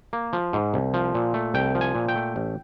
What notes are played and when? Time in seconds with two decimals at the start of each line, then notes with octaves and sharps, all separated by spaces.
0.13 A#3
0.33 F3
0.53 G#2
0.74 C2
0.94 F3
1.14 A#2
1.34 A3
1.54 C2 G5
1.75 F3
1.81 G#5
1.95 A#2
2.09 G5
2.16 A3
2.36 A1